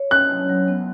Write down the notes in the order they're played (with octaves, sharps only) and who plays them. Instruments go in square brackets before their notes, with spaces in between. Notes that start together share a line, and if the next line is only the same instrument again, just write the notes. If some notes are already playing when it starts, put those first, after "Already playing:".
Already playing: [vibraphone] C#5
[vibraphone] C#4 [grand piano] F#6
[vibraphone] F#3
F#3
B3